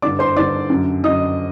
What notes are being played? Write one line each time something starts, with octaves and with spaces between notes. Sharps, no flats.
G2 D3 D5 D6
C5 C6
G2 D3 D5 D6
F#2 D3
F#2 D3 D#5 D#6